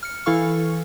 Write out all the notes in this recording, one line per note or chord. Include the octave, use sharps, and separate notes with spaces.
F6 C#7
E3 E4 A4 F5 C#6 F6